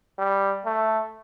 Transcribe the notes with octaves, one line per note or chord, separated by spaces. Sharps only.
G3
A3